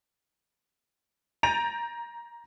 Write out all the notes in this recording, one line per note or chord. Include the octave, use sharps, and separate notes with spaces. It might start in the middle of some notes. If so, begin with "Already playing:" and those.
A#5 G6 A6 D7 D#7 F7